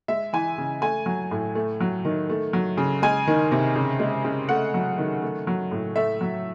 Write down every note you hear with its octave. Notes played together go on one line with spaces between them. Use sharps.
G#3 E5
E3 G#5
C#3
A3 G#5
F#3
A2
A3
F#3
D#3
A3
F#3
C#3
G#3 G#5
D#3
C3
C#3
G#3
C#3
A3 F#5
F#3
D#3
A3
F#3
A2
A3 E5
F#3